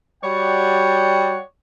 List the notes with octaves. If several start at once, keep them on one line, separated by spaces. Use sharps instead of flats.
G3 F#4 C#5 D5 F#5 G5